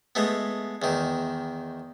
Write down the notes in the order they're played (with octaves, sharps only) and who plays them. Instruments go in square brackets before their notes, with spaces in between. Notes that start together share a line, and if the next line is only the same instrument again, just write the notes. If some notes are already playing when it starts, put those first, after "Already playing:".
[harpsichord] G#3 A3 B3
E2 D#3